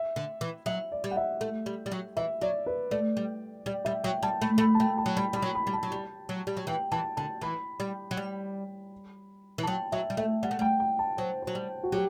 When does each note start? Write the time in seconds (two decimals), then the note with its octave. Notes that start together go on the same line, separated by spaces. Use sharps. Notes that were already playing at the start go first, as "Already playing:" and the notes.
Already playing: E5
0.16 D3
0.41 E3
0.66 F#3 E5
0.92 D5
1.04 G3
1.11 F#5
1.17 E5
1.41 A3
1.66 G3
1.86 G3
1.92 F#3
2.17 E3 E5
2.41 F#3 D5
2.66 B4
2.91 A3 D5
3.17 G3
3.66 G3 D5
3.85 G3 E5
4.04 F#3 G5
4.23 G3 A5
4.41 A3 B5
4.58 A3
4.60 B5
4.75 A5
4.80 A3 G5
4.98 A5
5.06 F#3
5.17 G3 B5
5.33 G3 B5
5.42 F#3
5.55 B5
5.67 G3
5.73 A5
5.83 F#3
5.92 G3
6.29 F#3
6.47 G3
6.57 F#3
6.67 E3 G5
6.92 E3 A5
7.17 D3 A5
7.41 E3 B5
7.80 G3
8.11 F#3
8.17 G3
9.58 E3
9.63 A5
9.67 F#3 G5
9.92 F#3 E5
10.10 G3
10.17 A3 E5
10.43 G3 F#5
10.51 A3
10.59 G3 G5
10.80 G5
10.99 A5
11.17 F#3 C5
11.42 F#3 C5
11.55 G3
11.83 F#4
11.92 F#3 G4